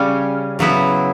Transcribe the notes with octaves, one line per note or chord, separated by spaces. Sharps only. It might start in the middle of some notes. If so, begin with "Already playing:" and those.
Already playing: C#3 G3 C#4
C#3 F#3 B3 E4